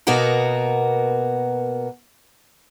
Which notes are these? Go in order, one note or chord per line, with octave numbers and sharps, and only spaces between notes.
B2 A#3 B3 F#4 A#4